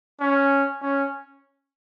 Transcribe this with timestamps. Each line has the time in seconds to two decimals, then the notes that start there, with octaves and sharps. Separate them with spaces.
0.21 C#4
0.82 C#4